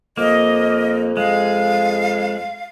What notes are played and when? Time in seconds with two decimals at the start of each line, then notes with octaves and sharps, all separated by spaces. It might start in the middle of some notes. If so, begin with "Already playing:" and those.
0.17 F2 A#3 D#5
1.17 G#3 F5